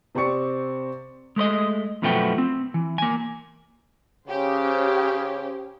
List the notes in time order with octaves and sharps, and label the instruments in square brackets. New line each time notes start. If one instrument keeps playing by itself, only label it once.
[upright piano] C3 C4 C5 D5 C#6 C#7
[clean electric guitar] G#3 A3 C5 D#5
F#2 B2 F3 A3 B3 G5
C4
E3
A#3 G#5
[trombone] C#3 [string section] C#4 G4 C5